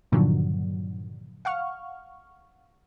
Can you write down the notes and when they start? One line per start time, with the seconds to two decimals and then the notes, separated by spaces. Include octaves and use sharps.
0.12 G2 A#2 D3 D#3 F3 F#3
1.45 F5 F#5 C#6 F6